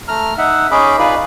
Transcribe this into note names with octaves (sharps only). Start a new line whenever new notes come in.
A3 A#5 F6
D#4 E5 F#5
C#4 D#4 G#4 D#5 B5 D6
D#4 F4 G#4 B4 D5 B5